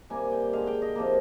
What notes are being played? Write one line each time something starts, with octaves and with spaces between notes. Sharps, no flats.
C3 G3 A#3 G#5
G5
D3 G#3 F5
G5
D#5
C3 F3 A#3